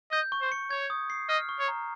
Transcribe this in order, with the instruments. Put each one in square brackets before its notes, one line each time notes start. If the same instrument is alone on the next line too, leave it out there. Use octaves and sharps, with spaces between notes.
[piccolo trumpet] D#5 [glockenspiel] G6
[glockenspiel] C#6
[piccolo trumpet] C5
[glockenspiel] C#7
[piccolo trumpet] C#5 [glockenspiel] G#6
[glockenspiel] D#6
C7
[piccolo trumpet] D#5 [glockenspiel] F6
[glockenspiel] C#6
[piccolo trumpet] C#5
[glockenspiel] A#5